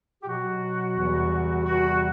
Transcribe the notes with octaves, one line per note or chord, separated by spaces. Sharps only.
G4
B2 F#3 F#4
E2 C3 E3 G3
E2 C3 E3 G3 F#4